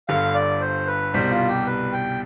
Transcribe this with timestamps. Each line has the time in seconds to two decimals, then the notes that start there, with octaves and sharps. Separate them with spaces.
0.09 G1 G2 D3 F5
0.34 D5
0.61 C5
0.87 B4
1.13 C2 B2 G3 C5
1.31 F4
1.48 G4
1.66 B4
1.93 G5